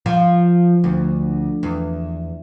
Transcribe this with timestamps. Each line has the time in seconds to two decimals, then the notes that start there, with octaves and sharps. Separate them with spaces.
0.06 F3
0.84 D2
1.63 E2